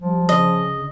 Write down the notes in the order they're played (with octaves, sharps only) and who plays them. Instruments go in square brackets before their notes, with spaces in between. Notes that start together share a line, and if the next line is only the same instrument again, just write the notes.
[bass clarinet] F3 [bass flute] G3
[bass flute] C#3 [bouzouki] D#5